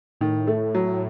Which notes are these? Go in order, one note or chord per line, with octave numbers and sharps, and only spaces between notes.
A2 D#3
A3
F#3